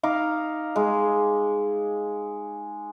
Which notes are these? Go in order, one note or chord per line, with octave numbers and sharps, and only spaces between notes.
D#4 F5 D6
G#3